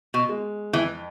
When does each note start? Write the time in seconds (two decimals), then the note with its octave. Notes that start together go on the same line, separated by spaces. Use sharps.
0.14 B2
0.29 G#3
0.73 F2 E3